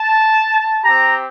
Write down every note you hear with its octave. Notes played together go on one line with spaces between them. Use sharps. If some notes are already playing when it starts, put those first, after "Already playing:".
Already playing: A5
C4 G4 A#5